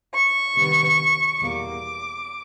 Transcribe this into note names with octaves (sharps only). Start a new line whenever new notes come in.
C#6
C3 D#3 G3 B3
E2 B2 G3 A#3 D6